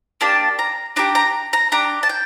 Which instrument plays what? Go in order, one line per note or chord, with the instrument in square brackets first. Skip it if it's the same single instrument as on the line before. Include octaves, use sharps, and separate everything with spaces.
[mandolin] A#3 D4 G4 A5
A#5
D4 G4 A#5
A#5
A#5
D4 G4 A#5
A5
G5